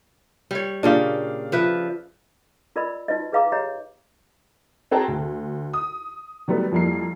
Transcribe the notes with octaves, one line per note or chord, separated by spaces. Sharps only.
G3 C#5
A#2 C#3 D4 G4 F5
F3 B4 E5
F4 A#4 D5 D#5 B5 E6
D#4 F4 F#4 B4 C5 D#5
G#4 B4 D#5 F5 A#5 D6
G4 C#5 D#5 A#5
C4 F#4 G#4 G5 A5 A#5
D2
D#6
D#3 F#3 G3 A3 B3
F2 F3 G3 A#3 E4 C7